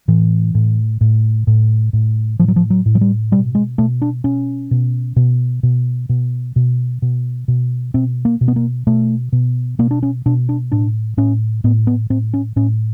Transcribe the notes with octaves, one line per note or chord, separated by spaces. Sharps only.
A2 E3
A2
A2
A2
A2
A2 F3
F#3
F3
F#3
A2
F#3
G3
B2 G3
G#3
B2 A3
D4
B2 C#4
B2
B2
B2
B2
B2
B2
B2
B2 C4
A#3
B2
B3
A#3
B2 A3
B2
B2 A#3
D4
C#4
B2 D4
D4
A2 D4
A2 C#4
A2 B3
B3
A2 C4
C#4
A2 C#4